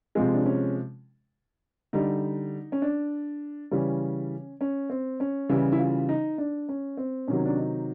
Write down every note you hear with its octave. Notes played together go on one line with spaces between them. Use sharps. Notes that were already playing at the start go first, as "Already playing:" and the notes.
C3 F3 G#3 C4
D4
C#4
D3 G3 D#4
C#4
D4
C#3 E3 G3 C#4
C#4
C4
C#4
C#3 E3 G3 E4
E4
F4
D#4
D4
C#4
C4
C3 D#3 F#3 C#4
D4
D#4